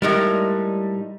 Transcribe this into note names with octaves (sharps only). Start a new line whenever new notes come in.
A2 G3 G#3 D#4 A#4